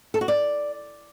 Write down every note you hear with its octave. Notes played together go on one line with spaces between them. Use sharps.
A4
F#4
D5